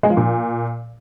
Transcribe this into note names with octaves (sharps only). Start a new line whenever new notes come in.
G#3
F3
A#2